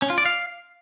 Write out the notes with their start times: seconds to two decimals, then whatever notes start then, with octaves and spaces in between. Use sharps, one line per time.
0.02 C#4
0.10 F4
0.18 D5
0.25 F5